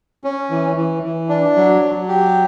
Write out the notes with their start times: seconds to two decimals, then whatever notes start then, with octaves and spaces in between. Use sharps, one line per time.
0.24 C#4
0.50 E3
0.77 E3
1.03 E3
1.29 D4
1.56 F#3
1.82 F#3
2.09 G4